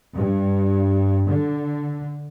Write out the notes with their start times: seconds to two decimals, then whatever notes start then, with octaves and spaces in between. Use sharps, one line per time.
0.17 G2
1.30 D3